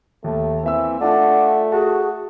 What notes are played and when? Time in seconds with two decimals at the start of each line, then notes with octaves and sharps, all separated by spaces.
0.24 D#2 A3
0.64 E3 A#3 C4 E5 E6
1.01 A3 D4 F4 A4 D5 F#5
1.72 F#4 G#4 A5